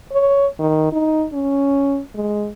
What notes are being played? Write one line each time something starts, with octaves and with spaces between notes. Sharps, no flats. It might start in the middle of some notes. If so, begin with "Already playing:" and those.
C#5
D#3
D#4
C#4
G#3